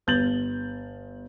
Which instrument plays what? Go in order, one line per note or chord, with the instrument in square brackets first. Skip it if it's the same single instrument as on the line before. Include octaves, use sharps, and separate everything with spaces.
[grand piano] G1 G6 A6 F#7